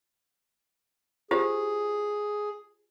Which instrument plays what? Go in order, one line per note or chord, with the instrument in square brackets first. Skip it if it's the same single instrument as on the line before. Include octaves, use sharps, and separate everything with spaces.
[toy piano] F4 G4 C5 [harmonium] G#4